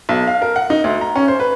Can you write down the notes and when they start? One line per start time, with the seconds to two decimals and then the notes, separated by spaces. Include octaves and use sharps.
0.09 B1
0.27 F5
0.42 A#4
0.56 F#5
0.70 D#4
0.84 D2
1.01 A#5
1.16 C#4
1.28 C5
1.40 B4